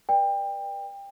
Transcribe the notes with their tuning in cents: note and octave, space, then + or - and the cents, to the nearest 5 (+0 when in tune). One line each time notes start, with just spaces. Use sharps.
B4 -35 D5 +15 G5 +25